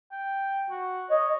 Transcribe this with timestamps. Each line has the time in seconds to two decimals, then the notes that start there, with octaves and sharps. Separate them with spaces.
0.12 G5
0.70 F#4
1.10 C#5 D#5